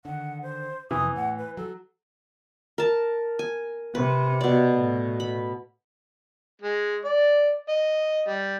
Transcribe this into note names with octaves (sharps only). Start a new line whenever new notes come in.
D3 D#3 F#5
C5
F2 C3 E3 D#6
A2 F#5
B4
F#3 A4
A#4 A5
G#5
C3 B4
B2 D5
A2
B5
G#3
D5
D#5
G3